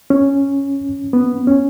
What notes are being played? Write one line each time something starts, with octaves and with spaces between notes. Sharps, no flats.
C#4
B3
C#4